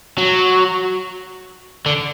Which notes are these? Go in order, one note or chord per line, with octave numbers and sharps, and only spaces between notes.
F#3
D3